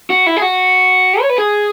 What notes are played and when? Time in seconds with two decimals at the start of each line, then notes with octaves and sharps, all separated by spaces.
0.10 F#4
0.26 E4
0.37 G#4
0.42 F#4
1.21 C#5
1.29 B4
1.38 G#4